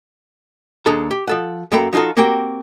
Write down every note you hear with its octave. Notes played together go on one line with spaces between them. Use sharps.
D#2 D4 G#4 A4 A#5
G4
F3 A4 F#5
F#2 A#3 A4 G5 A#5 B5
F3 D#4 F4 F#4 A4
A#3 C4 F#4 G4 A#4 G5